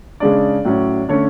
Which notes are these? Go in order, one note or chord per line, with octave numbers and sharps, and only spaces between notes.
C#3 G#3 D4 D5
A2 F#3 C#4
D3 A3 C#4 C#5